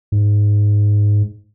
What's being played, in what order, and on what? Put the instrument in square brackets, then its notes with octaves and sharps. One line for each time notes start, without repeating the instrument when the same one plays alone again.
[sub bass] G#2